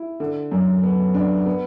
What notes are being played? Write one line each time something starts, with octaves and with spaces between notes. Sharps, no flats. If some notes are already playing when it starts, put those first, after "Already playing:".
Already playing: E4
D3
F#2
B3
D4
B3